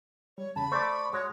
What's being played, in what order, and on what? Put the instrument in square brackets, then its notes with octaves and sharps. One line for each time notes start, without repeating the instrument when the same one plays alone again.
[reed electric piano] G3 [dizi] C#5
[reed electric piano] E2 C#3 [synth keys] A5 [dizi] B5
[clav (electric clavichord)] A3 [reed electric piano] C5 D5 A5 [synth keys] C#6 D6
[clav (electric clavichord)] G#3 F#4 [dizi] C#5